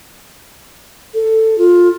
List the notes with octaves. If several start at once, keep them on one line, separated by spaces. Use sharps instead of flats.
A4
F4